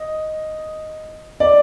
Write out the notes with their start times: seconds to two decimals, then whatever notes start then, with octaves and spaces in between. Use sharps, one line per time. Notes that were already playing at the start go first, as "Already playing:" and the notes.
Already playing: D#5
1.40 D5